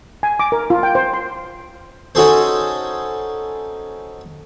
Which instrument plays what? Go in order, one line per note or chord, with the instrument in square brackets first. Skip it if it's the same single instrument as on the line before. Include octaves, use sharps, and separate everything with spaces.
[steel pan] G#5
D6
A#4
F4
G5
C5
C6
[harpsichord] C#4 D#4 F#4 G#4 A4 C5